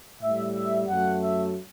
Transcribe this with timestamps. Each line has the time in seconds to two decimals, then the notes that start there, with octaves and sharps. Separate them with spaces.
0.21 A2 G3 E5
0.55 E5
0.88 F#2 F#3 A3 F#5
1.22 E5